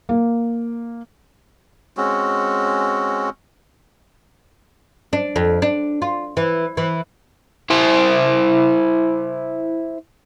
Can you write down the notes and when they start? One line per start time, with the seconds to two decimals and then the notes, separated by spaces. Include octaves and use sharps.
0.09 A#3
1.97 G#3 C4 C#4 F#4
5.13 D4
5.36 F2
5.62 D4
6.02 F4
6.37 E3
6.77 E3
7.70 E4 C5